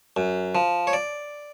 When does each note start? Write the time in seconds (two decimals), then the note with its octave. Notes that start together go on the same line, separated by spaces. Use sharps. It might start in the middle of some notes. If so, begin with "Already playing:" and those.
0.17 F#2
0.55 F3
0.87 C#5
0.93 D5